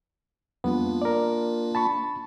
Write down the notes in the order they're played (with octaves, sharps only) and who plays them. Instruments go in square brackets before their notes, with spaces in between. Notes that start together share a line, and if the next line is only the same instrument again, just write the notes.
[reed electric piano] F2 G3 B3 [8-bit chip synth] A#3 D4 F4
[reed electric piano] A#4 D5
A5 B5 C#6